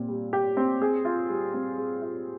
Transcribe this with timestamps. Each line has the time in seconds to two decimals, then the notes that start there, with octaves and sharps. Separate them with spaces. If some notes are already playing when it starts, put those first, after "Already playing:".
Already playing: A#2 C4 G4
0.08 G3
0.33 G4
0.57 C4
0.82 G#4
1.05 F4
1.29 G3
1.54 C4
1.78 G#4
2.02 F4